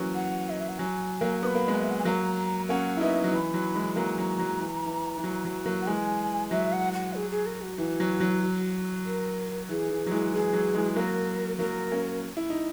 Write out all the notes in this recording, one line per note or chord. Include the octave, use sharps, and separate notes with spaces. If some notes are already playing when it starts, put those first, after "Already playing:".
Already playing: E3 F#3 A#3 C#4
F#5
D#5
E5
F#5
F#3 G#5
F#3 A#3
B3 B5 D#6
A#3
G#3 B3
D#5
E5
F#5
G#5
F#3 A#3 A#5
A#3 C#4 F#5
E4
B3 D#4 E5
F#3
E3 B5
F#3
E3 G#3
F#3 A#3 A#5
F#3
F#3
E3
E3
E3
F#3
F#3
F#3 A#3
F#5
E3 G#3 G#5
F#3 E5
F#5
F#5
G#4
G#4
A#4
F#4
E3
F#3
F#3
A#4
E3 G#4
E3
F#3
E3 G#3
E3 G#4
F#3
E3 G#3
F#3 A#3 A#4
F#3 A#3 A#4
A#3 C#4
E4
D#4